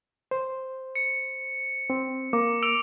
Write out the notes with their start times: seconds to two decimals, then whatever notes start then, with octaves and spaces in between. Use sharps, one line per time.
0.31 C5
0.95 C#7
1.90 C4
2.33 A#3 D6
2.63 E6 D7 F7